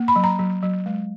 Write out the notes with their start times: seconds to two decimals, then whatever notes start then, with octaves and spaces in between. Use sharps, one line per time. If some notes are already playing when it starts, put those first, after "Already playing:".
Already playing: A#3
0.08 B5
0.16 F#3
0.24 A#5
0.39 F#3
0.63 F#3
0.86 G#3